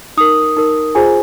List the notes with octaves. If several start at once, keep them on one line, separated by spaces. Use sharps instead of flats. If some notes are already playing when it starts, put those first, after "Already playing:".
D#4 A#4 D#6
D#4 A#4
F4 G#4 C5 G#5